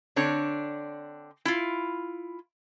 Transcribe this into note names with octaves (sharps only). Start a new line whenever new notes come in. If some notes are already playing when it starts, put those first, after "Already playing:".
D3 C4 D4 C#5
E4 F4